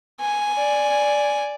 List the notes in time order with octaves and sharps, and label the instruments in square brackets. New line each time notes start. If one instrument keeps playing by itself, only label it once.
[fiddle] G#5
[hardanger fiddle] D5